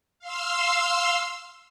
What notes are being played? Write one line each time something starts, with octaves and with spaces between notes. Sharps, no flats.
F5 C6 E6